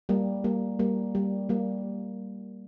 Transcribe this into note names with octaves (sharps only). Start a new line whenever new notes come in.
G3 A#3
G3 A#3
G3 A#3
G3
G3 A#3